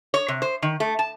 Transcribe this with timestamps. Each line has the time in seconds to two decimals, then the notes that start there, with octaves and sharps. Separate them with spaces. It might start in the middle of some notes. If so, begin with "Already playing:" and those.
0.14 C#5
0.28 C3
0.42 C5
0.62 D#3
0.80 A3
0.99 A5